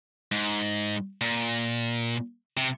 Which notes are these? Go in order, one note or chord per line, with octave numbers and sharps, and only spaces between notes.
G#2
A#2
C3